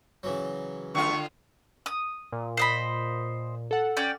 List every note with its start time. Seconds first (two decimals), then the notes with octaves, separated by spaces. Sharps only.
0.23 C#3 E3 F#3
0.95 D3 A3 F4 C#6
1.86 D#6
2.32 A#2
2.57 C5 D#5 B5
3.71 A4 F#5
3.97 C#4 D5 G5